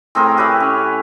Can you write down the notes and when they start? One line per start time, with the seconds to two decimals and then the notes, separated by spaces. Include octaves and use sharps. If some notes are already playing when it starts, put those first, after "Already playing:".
0.15 A2 C4 G#4 A#4
0.37 G4 B4 C#5 E5
0.60 C#4